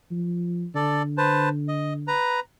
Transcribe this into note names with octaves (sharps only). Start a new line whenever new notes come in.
F3
D3 A4 D5
B4 C5 A5
D#5
B4 A#5